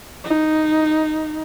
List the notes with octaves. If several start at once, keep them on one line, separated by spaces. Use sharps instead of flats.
D#4